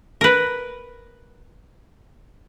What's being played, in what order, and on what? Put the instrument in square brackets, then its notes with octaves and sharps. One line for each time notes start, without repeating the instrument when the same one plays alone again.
[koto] A#4 B4